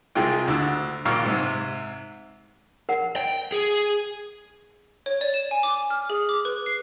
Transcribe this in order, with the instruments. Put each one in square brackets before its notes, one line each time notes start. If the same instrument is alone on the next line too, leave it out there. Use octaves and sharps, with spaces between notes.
[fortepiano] C2 C3 G#3 F4 G5
D2 D3 E6
G#1 A#2 F5 C#6 E6
G#2 C3
[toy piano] A#4 F#5
[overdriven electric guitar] G5
G#4
[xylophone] C#5
D5
E7
G#5
D6
F6
G#4
D6
B4
C7